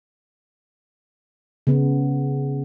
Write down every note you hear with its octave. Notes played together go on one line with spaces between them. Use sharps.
C#3 B3